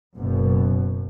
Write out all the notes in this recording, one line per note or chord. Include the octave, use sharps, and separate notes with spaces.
F#1 F#2 B2